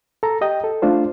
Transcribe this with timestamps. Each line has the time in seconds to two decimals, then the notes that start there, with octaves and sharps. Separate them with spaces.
0.23 A4 A#5
0.41 G4 D#5 G5
0.64 A4
0.82 A3 D4 F4 C5